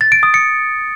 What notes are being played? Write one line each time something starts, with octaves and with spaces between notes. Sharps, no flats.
A6
D7
D#6
C#7